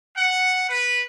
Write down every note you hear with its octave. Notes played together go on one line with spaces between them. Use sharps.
F#5
B4